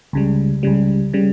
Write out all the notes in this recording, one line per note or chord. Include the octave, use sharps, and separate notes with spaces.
C#2 C#3 G3
C#2 C#3 G3
C#3 G3